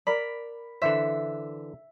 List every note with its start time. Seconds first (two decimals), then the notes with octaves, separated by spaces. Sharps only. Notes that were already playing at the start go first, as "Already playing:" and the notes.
0.07 A#4 D5 B5
0.82 D3 E3 C5 E5